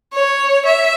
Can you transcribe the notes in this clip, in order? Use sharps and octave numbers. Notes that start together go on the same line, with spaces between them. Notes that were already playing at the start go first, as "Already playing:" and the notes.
C#5
E5